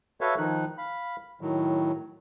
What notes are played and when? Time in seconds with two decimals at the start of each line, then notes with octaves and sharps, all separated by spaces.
0.21 F#4 A4 B4 C#5 E5 F5
0.38 D#3 F3 D#4 F#6
0.78 F5 B5
1.41 A2 D#3 F#3